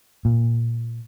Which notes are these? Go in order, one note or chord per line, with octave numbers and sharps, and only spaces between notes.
A#2